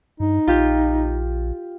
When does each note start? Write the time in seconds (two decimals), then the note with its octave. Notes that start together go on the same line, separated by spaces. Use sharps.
0.20 G2 D#4
0.47 A#1 F4 G4